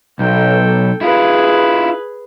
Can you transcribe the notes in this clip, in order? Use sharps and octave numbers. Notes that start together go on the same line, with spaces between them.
B1 A4 G5
E4 F4 G#4 B4